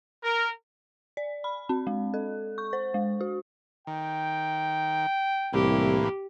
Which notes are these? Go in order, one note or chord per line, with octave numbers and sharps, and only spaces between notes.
A#4
D5
B5
C4
G#3
A4
C#6
C5
G#3
F#4
D#3 G5
C2 A2 E3 A#3 G4